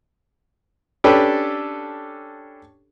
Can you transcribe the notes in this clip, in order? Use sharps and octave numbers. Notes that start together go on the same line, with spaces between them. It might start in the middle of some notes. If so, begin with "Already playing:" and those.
C#4 D4 G4 A4 B4